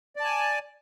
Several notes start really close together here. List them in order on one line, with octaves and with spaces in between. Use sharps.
D5 A5 G#5